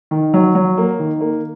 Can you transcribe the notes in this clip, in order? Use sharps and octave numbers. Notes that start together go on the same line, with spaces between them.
D#3
F#3
F#3
A#3
D#3
A#3